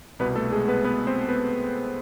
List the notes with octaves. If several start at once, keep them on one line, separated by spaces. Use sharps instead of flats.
C2 B2 B3 B4
A3 A4
G#3 G#4
B3 B4
B3 B4
C4 C5
B3 B4